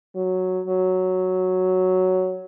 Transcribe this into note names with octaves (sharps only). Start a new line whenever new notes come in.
F#3
F#3